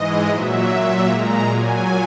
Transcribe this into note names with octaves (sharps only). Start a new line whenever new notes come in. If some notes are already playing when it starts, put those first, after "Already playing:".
Already playing: G#2 E3 G#3 D#5
A#2 F#3 E5
A#2 F#3
A#2 G#3 A#5
A#2 F#3 G#5